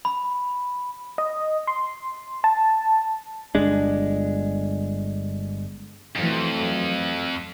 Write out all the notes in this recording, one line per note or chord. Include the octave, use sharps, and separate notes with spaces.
B5
D#5
C6
A5
G1 G#3 D4
F2 E3 F#3 A3